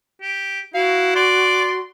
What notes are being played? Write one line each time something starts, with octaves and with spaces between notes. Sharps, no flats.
G4
E4 F#4 F5
D5 C6